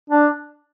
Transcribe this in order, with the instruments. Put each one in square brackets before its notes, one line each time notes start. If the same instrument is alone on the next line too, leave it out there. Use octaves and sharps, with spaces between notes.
[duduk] D4